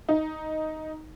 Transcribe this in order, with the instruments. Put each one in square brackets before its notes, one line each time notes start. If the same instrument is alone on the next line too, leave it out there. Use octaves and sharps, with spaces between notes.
[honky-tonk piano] D#4